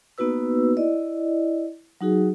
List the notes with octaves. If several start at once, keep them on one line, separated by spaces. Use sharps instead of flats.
A#3 B3 D#4 F#4 B4 E6
E4 D5 D#5
F#3 D#4 F#4 G#4